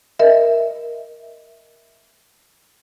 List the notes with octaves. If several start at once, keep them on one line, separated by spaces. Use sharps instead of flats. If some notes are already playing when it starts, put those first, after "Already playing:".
A#4 D#5 E5